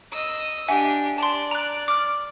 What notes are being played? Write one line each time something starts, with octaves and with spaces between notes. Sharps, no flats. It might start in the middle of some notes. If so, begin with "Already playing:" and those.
D#5 E6
D4 G4 E5 F#5 G#5
D5 A5 C6
A#5 F#6
D6 F6